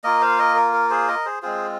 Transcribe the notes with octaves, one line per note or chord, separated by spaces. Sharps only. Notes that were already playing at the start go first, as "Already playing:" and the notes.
A#3 F4 A#4 D#5
C5 F5
A#4 D#5
A#4
A#4
G#4 C5
A#4 D#5
G#4 C5
G#3 C4 F4 G#4 C5